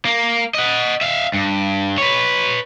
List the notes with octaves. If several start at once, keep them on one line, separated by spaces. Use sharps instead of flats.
A#3
D#5 F#5
E5 F5
G2
B4 C#5